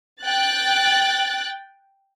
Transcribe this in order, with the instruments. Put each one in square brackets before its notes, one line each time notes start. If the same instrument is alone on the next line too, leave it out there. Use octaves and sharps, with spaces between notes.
[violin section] G5 F#6 A6